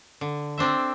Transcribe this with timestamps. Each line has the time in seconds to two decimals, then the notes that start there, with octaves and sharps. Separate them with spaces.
0.21 D3
0.58 C4 D4 C5 E5